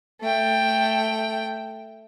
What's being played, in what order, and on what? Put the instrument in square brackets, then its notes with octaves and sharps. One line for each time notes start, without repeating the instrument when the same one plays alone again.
[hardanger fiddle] A3 G5